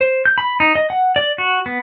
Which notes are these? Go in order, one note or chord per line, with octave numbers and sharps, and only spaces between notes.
C5
G6
B5
D#4
D#5
F#5
D5
F#4
B3